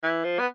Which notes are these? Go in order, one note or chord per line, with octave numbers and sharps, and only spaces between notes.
E3
F3
B3